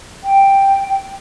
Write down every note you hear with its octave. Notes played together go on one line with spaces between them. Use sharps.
G5